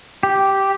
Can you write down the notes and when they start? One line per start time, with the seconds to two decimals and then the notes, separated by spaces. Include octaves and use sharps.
0.23 G4